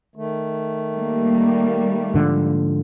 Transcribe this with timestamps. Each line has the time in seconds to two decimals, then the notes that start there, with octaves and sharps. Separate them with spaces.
0.16 D#3 A3
0.95 G3 A#3
2.14 G#2 D3 F3